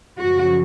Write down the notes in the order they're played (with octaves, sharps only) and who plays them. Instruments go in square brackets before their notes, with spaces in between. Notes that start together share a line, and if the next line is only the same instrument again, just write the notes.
[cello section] F#2 C#3 F3 F#4